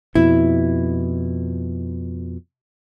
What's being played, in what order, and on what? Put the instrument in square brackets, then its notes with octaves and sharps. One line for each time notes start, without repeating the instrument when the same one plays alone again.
[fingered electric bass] F2 B2 [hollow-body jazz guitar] E4